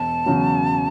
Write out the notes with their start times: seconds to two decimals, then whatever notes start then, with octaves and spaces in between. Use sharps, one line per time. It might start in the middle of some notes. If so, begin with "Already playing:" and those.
Already playing: E1 A5
0.26 E2 C#3 F#3